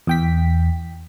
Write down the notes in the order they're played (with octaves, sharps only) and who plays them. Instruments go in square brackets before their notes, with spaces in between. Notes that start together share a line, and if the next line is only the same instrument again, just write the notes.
[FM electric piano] E2 G5 B6